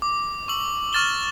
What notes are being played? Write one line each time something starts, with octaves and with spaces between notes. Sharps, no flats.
D6
C#6 E6 F#7
C#6 F6 A6 E7 G7